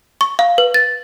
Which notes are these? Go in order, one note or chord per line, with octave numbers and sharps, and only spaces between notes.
C#6
F5
B4
A6